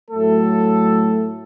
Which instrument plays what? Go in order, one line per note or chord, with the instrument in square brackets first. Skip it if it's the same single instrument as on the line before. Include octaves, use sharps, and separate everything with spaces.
[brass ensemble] A2 F#3 A3 A4